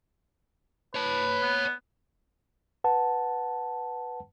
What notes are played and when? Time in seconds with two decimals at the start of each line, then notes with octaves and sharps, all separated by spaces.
0.95 B4 C#5 A5
1.42 B3
2.84 B4 F#5 A5